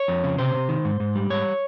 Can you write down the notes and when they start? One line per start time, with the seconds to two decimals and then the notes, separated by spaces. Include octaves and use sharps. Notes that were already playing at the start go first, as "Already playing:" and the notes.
Already playing: C#5
0.08 F2
0.24 C#3
0.38 C3 C5
0.54 C3
0.69 D#3
0.85 G#2
1.00 G#2
1.15 G3
1.30 G#2 C#5